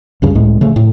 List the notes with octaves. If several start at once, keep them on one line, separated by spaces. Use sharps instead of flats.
C#2 G2 C#3
C#2 A2 G#3
C#3 F3 A3
A2